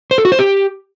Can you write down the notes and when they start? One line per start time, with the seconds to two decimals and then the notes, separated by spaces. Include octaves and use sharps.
0.11 C5
0.18 A4
0.25 F#4
0.32 C5
0.39 G4